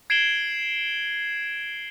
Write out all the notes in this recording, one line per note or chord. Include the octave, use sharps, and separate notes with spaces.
G#6 C7 D7 E7 F#7 G7